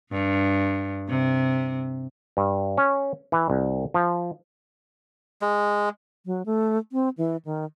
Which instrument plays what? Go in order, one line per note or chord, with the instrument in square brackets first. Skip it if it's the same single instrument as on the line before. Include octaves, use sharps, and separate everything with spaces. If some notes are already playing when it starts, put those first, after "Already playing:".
[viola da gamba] G2
C3
[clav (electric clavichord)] G2
C#4
E3
C2
F3
[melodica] G#3
[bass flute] F#3
A3
C4
E3
D#3